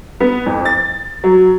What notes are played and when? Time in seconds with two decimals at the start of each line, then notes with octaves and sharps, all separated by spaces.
0.20 B3
0.46 F2
0.65 A6
1.24 F#3